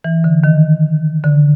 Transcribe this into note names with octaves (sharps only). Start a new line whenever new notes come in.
E3
D3
D#3
D3